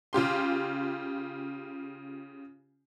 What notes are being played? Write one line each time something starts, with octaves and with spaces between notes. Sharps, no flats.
C#3 F4 G4 C6